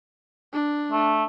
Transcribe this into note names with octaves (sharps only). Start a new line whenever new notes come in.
D4
A3